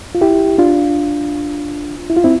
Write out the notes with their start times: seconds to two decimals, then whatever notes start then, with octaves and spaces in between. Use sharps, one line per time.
0.15 F4
0.21 E4 G4
0.58 D4 F4
2.10 E4
2.17 F4
2.24 C4 E4